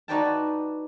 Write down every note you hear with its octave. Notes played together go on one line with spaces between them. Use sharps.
D#4 F#4 B4 D5 G5 A5